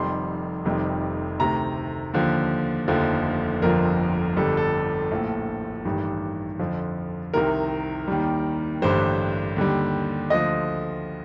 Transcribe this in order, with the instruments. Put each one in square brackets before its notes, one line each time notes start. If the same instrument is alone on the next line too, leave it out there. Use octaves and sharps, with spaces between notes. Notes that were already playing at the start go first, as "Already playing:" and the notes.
Already playing: [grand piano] F1 F2 C3 D#3 G3 C6
F1 F2 C3 D#3 G3
D2 C3 D#3 A#5
D#2 D3 F3
F1 D#2 D3 F3
G1 F2 D3 F3 A#4
G1 F2 D3 G3 A4
A4
A#1 A2 F3
A1 G2 D#3 G3
F2 D3 F3
C2 C3 D#3 A#4
D#2 D#3 G3
A1 G2 D3 G3 C5
D#2 D3 G3
D2 D3 F3 D#5